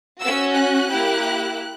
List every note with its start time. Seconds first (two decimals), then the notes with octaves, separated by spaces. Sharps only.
0.21 C#4 F#4 E6
0.55 F#6
0.89 A#3 E4 G4